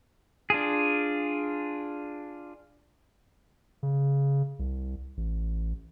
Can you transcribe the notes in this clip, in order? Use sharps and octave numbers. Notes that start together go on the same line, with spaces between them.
D4 F4 G#4
C#3
C2
A1